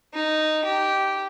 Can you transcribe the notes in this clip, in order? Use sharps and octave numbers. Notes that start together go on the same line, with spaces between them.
D#4
G4